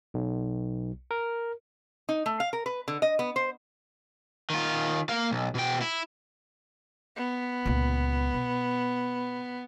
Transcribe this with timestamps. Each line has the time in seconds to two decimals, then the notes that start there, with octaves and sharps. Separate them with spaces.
0.14 B1
1.11 A#4
2.09 D#4
2.26 A3
2.40 F5
2.53 A#4
2.66 B4
2.88 D3
3.02 D#5
3.19 B3
3.36 C5
4.50 D#3 F4
5.09 A#3 F5
5.31 B1
5.55 B2 G5
5.81 E4
7.16 B3
7.65 C#2 A#2
8.34 B2